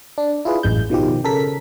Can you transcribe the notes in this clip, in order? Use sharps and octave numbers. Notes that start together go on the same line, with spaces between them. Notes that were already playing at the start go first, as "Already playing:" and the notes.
D4
E4 F4 G#4 B4
A1 F#2 G#3 G6
B2 D#3 F3 G4
C#3 A4 A#4 B6